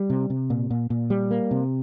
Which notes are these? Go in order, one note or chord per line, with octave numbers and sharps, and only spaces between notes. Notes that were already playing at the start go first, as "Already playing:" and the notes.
Already playing: G3
C3
C3
A#2
A#2
A#2
G3
A#3
C3